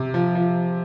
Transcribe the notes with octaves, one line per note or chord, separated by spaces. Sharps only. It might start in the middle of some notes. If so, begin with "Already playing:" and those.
Already playing: C3
F3
F3